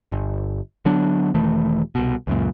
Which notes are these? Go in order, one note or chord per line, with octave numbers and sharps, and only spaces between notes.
G1
D3 F#3 B3 D4
E1 D#3 E3 A3
C2 B2
C#2 F#2 A#2